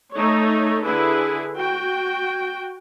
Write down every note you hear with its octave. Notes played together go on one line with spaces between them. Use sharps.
A3 D#4 A4 C#5
D3 E4 G#4 B4
F#4 G5